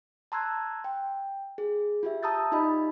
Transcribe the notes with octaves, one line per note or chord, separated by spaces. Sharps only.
A5 A#5 C6 E6 F#6 G#6
G5
G#4
F4 G4 E5
A5 A#5 D#6 E6 G6 A6
D#4 F4 G4 D5 D#5 B5